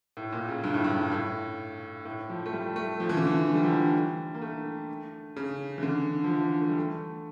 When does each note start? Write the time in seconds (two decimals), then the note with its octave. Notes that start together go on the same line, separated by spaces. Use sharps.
0.17 A2
0.32 A#2
0.49 C#3
0.64 G2
0.74 A2
0.84 G2
1.12 A2
2.05 A2
2.30 F3
2.46 A3
2.53 G3
2.76 A3
3.00 F3
3.09 E3
3.17 D3
3.27 E3
3.48 A3
3.55 G3
3.63 F3
3.72 G3
4.35 A#3
4.42 A3
5.36 C#3
5.78 E3
5.83 D3
6.24 F3
6.30 E3
6.61 A3
6.70 G3
6.78 A3